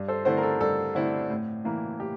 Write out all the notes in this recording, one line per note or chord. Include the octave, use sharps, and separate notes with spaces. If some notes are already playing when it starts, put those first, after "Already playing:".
Already playing: G2
A4 C5
D3 A3 C4 E4 A4 C5
A#4
A4
G2 A4
D3 A3 C4 E4
A2
E3 A#3 E4
A2 G4